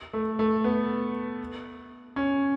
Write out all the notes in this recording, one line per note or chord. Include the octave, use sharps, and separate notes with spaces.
A3
A3
B3
C#4